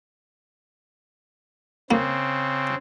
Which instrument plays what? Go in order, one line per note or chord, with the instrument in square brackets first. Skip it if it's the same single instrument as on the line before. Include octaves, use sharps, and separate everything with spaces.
[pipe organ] C#3 C4 [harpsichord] A#3